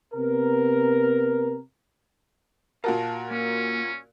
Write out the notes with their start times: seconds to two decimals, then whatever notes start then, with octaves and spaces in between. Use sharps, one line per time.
0.14 C3 B3 A#4
2.84 A#2 F#4 A#4 F5 A5
3.31 A#3 C#4